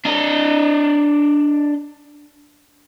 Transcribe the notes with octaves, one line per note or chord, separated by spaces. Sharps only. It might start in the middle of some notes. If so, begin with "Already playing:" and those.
D4 D#5